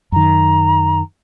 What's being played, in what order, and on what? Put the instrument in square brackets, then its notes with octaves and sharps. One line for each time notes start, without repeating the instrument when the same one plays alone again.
[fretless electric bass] F#2 D#3 [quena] A#5